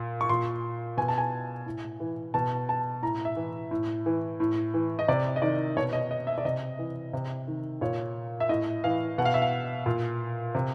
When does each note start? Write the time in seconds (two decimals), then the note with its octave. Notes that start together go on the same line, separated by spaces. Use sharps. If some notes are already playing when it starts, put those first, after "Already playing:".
Already playing: A#2
0.21 C#6
0.29 A#2 C6
0.97 B2 G#5
1.08 A5
1.18 G#5
1.66 A2
2.00 E3
2.34 B2 A5
2.69 A5
3.02 A2 A#5
3.25 E5
3.37 E3
3.71 A2
4.06 E3
4.40 A2
4.74 E3
4.99 D#5
5.08 C3 D5
5.36 D#5
5.42 D#3 D5
5.77 B2 C#5
5.93 D#5
6.11 D#5
6.27 E5
6.38 D5
6.45 C3 D#5
6.79 E3
7.13 C3
7.47 D#3
7.81 A#2 C#5
8.40 E5
8.49 A2 D#5
8.84 E3 F5
9.18 B2 F#5
9.25 F5
9.34 E5
9.42 F5
9.86 A#2
10.55 C3